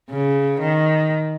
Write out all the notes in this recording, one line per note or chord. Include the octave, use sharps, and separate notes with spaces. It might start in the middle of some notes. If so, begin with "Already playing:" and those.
C#3
D#3